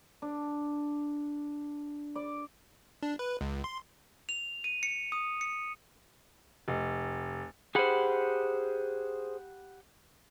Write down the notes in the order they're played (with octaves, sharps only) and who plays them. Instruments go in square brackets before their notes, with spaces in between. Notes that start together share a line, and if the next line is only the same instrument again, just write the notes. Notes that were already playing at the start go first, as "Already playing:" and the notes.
[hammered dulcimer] D4
D5
[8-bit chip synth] D4
B4
C#2
C6
[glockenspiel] F7
D#7
C#7
D#6
C#7
[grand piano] F1
[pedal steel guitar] G4 F#5 B5 [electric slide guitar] G#4 C5